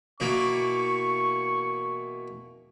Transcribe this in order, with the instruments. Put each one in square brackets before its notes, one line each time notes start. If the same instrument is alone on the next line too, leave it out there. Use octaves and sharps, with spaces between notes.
[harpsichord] B2 E3 A#3 [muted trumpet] C#6